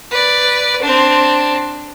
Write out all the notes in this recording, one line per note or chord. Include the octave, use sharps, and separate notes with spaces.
B4 D5
C4 D4